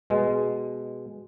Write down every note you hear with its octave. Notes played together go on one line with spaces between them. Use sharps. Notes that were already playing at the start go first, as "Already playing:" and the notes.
B2 G#3